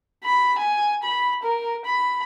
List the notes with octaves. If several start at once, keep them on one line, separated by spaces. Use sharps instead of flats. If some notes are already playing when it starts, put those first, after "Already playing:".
B5
G#5
B5
A#4
B5